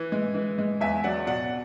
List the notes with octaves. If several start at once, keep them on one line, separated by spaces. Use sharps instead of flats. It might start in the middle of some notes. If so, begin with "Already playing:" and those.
Already playing: E3
G#3
E3
G#3
E2 E5 G#5
F#3 D5 F#5
B2 D5 F#5